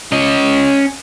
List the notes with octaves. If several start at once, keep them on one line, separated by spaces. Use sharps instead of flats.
C#4 D#5